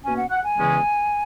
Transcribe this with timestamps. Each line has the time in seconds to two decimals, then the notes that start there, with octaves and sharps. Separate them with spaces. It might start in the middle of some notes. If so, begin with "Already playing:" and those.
0.04 B2 A#3 C#4 G#5
0.17 F#5
0.31 F#5
0.45 G#5
0.58 E2 C#3 E3 G#3 C#4